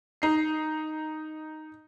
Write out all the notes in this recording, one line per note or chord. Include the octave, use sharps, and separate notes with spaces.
D#4 C7